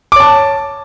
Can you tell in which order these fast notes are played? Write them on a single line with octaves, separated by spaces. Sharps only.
D6 C#5 A5